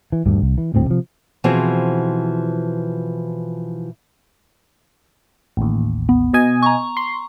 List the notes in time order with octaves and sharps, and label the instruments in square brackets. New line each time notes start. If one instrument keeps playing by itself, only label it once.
[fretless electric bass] E3
D#1 D2 G2
C2
E3
D#1 D2 A2 C4
C3 F3
[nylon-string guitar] B2 E3 F3 C4 F#4 G#4
[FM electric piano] A1 D#2
[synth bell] B3
[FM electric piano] B2 D#5 G#5
[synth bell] A#5 C#6
[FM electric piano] C6